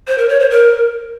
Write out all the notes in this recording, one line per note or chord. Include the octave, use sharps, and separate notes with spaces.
C5
A#4
C#5
C5
A#4